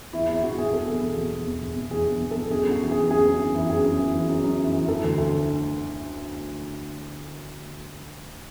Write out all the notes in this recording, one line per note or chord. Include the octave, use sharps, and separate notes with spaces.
E2 E4
E2 E4
B2 F#4
B2 G#4
E2 A4
E2
B2
B2
E2
E2
B2
B2
E2 G#4
E2
B2
A4
B2
F#2 G#4
F#2 F#4
E3
E3 G#4
F#2 G#4
F#2
E3
E3
F#2 G#4
F#2
E3
E3
F#2
F#2
E3
E3
E3 A4
D2
D2